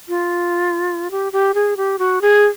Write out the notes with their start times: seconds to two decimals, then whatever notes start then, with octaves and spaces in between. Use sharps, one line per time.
0.08 F4
1.11 G4
1.33 G4
1.54 G#4
1.77 G4
1.99 F#4
2.21 G#4